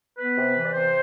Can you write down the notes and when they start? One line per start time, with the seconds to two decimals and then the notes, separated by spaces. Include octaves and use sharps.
0.18 B3 B4
0.37 C3
0.56 E3
0.65 D5
0.74 C3 C5